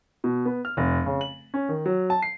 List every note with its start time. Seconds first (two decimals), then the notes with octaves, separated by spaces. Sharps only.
0.24 B2
0.46 B3
0.65 F6
0.77 F1
1.06 C#3
1.21 F#7
1.54 C#4
1.69 D#3
1.86 F#3
2.10 A5
2.22 C7